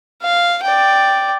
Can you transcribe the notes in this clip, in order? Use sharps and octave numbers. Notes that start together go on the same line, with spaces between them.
F5
D5 G5